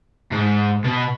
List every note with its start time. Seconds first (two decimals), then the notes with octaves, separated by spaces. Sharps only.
0.31 G#2
0.84 B2